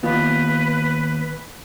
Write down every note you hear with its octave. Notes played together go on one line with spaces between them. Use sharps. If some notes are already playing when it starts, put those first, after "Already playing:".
D#2 B3 F4 B4